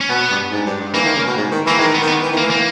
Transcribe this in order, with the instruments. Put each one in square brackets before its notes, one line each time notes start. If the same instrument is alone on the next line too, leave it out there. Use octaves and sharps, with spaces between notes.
[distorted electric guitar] C#4
[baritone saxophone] B2 [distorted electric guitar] B3
[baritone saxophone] G2
G#2
G2
G2
[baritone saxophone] E3 [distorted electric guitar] A#3
[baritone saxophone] D#3
C#3
B2
G#2
D#3
[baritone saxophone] E3 [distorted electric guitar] A#3
[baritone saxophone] D#3 [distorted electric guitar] G#3
[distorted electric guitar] B3
[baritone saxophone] D#3
[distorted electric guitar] B3
[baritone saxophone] E3
D#3
[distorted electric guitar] A#3
[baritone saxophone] E3
[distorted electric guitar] A#3